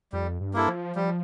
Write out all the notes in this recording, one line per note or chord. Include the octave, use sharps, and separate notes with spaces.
F2 G3
G2
A#3 E4 A4
F3
F3 G3